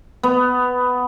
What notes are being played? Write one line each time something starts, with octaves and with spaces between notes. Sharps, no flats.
B3